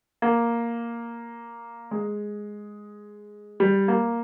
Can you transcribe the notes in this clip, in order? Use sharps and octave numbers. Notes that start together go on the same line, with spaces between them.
A#3
G#3
G3
A#3